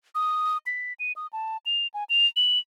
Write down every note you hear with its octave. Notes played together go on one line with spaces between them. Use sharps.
D#6
B6
D#7
D#6
A5
F7
G#5
F7
F#7